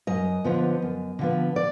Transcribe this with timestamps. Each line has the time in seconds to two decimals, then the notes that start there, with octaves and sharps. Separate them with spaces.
0.07 F#2 D#5
0.44 D3 F3 B3
0.82 F#2
1.19 D3 F3 B3
1.56 D5